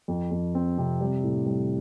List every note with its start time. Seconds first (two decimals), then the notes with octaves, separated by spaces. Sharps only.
0.08 F2
0.31 F2
0.55 C4
0.78 C3
1.01 G3
1.23 A2
1.46 G3